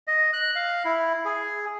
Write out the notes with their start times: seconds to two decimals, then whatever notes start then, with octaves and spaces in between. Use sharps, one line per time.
0.08 D#5
0.33 F#6
0.56 F5
0.85 E4
1.25 G#4